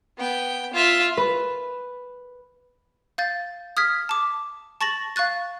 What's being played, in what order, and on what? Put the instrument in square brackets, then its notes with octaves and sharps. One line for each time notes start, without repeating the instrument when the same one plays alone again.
[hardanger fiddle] B3 G5
F4 E5
[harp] B4
[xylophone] F5 G6 A6
D#6 F6 G#6 B6
A5 D6
A5 C#6 A6 A#6 F#7
F5 C#6 F#6 A6